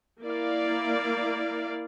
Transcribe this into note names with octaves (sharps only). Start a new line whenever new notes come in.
A#3 E4 D5 F5